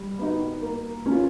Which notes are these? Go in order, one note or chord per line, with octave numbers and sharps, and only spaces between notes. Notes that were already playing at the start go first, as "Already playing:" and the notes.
Already playing: G3
B3 D#4 F#4
A#3
C#4
F4